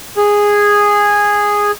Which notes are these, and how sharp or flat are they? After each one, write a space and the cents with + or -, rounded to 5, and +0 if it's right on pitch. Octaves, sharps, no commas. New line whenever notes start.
G#4 -10